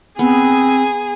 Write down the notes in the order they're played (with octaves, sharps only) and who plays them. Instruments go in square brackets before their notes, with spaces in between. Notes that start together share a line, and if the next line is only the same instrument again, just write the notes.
[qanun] B3 [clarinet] C4 [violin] G#4